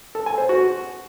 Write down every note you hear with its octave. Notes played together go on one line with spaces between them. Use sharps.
A4
G#5
C5
F#4